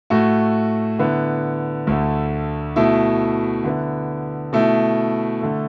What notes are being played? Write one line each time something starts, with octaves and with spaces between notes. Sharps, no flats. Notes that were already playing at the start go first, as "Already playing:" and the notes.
A2 A3 F#4
D3 B3 E4
D2 D3 A3
B2 A3 E4
D3 B3 E4
B2 A3 E4
D3 A3